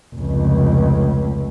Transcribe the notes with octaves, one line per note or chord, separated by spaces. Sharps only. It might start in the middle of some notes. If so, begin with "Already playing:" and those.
F1 C#2